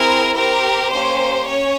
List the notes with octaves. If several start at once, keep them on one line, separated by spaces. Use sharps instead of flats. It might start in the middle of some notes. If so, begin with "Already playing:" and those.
Already playing: C4 E4 G#4 A#4
C4 G4 A#4
A#3 C#4 G4 C5
C#4 C#5